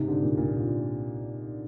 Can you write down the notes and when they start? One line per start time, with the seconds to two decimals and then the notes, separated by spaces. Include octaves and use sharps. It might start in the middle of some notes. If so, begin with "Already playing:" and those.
Already playing: G#2 C3
0.08 D3
0.22 A#2
0.37 A#2